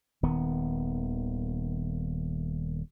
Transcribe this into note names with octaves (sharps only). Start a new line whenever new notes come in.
D#1 D#3 B3